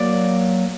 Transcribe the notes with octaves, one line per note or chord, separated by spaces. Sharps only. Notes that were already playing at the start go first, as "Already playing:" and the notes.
Already playing: F#3 A#3 D5